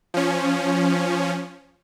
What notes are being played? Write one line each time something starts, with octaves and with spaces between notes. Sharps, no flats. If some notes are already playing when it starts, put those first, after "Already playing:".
F3 C#4